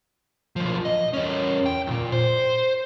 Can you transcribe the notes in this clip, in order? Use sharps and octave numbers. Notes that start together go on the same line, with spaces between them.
B1 F3
D#5
E2 C#4
G5
E2 A#2
C5